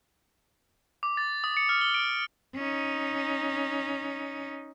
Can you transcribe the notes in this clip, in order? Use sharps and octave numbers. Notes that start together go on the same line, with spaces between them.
D6
A6
D#6
C#7
F6
G7
D7
C#4 D#4